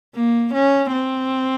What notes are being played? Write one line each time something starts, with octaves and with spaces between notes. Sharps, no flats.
A#3
C#4
C4